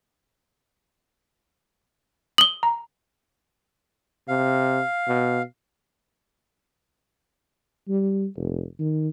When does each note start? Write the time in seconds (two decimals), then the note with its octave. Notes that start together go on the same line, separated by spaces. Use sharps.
2.38 D#6 F#7 G7
2.63 A#5
4.28 C3 F5
5.08 B2
7.89 G3
8.37 F1
8.79 D#3